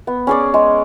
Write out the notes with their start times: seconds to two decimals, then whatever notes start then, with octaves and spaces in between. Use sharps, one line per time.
0.07 B3
0.27 C#4 G#4 D5
0.54 G#3